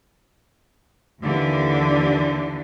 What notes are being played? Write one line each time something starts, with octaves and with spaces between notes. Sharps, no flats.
D#2 D3 E3